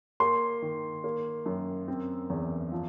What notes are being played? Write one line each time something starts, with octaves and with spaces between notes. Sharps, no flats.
A#3 C6
D#3
A#3
F#2
C4
E2
F3